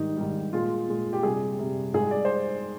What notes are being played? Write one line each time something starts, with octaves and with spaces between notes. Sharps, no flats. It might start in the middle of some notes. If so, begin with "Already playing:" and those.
Already playing: G#2 D#3 G3 D#4
G#2 D#3 G3
A#2 G#3 F4
A#2 G#3
G4
C3 G3 G#4
C3 G3
G#2 G3 G#4
D5
C5